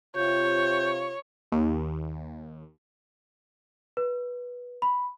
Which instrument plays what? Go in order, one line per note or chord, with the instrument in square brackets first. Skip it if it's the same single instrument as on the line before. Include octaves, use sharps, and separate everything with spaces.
[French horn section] C3 F4 [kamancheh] C#5 [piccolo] G6
[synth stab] D#2
[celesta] B4
B5